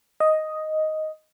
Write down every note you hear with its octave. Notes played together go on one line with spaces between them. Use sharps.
D#5